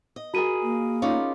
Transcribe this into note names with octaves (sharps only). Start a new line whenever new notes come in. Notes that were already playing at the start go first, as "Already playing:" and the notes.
D#5
F#4 G#4 A#4 B5 D#7
A#3
C#4 D#4 F4 D5 F5